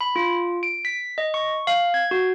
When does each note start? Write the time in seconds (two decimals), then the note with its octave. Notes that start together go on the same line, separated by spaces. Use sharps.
0.01 B5
0.16 F4
0.63 D7
0.85 B6
1.18 D#5
1.34 C#6
1.67 F5
1.94 G#6
2.11 F#4